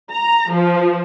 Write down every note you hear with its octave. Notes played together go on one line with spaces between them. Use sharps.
A#5
F3